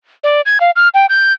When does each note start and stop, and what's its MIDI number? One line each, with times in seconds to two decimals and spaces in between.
0.24 0.41 74
0.46 0.58 92
0.60 0.71 77
0.76 0.88 89
0.94 1.06 79
1.09 1.33 91